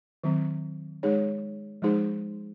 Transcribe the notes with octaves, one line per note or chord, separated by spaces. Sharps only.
D#3 F#3 C4
G#3 D#4 G#4 C#5
F3 G#3 D#4 G#4 C5